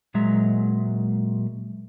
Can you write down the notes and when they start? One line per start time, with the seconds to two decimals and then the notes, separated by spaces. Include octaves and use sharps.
0.14 A#2 F#3 G#3 E5 A#5